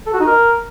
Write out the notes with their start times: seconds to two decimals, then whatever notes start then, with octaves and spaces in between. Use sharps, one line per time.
0.06 A4
0.13 F#4
0.20 D#4
0.27 A#4